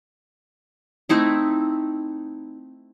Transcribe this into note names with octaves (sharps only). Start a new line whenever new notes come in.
A3 C4 D#4 E4